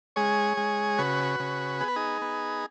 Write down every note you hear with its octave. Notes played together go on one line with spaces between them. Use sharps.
G#3 G#4 C#5
G#3
C#3 F#4 B4
C#3
B3 G#4
B4
D#4 G#4
B3